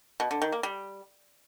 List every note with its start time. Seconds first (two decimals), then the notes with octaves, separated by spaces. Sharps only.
0.20 B2
0.31 D3
0.42 D#3
0.52 A#3
0.63 G3